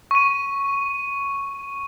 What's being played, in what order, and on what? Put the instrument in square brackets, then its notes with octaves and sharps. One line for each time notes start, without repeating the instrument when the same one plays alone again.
[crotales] C#6 D#7